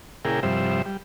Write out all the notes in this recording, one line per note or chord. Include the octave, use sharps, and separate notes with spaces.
A#2 C#3 E4 G#4 A#4 G5
G2 C3 F3 G3 C5 E5
G3